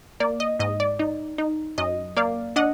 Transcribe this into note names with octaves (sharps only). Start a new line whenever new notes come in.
A#3 D5
D#5
G#2 D#5
D5
D#4
D#4
F#2 D#5
A#3 D5 F5
D4 D#5 F#5